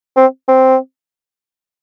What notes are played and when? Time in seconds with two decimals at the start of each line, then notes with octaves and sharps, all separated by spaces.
0.16 C4
0.48 C4